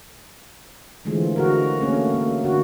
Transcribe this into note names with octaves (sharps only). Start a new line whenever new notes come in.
D3 E3 F3 G#3 A3
D3 F#4 A#4
A3 A#3 C#4
A#3
D3 F#4